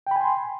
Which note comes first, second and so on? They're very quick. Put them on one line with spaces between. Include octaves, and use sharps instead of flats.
G5 B5 G#5 C6